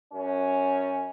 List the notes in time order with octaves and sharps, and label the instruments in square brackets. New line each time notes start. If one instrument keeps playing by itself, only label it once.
[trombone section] F#2 C#4